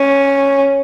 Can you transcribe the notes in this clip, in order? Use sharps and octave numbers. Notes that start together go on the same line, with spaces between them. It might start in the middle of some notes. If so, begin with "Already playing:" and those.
Already playing: C#4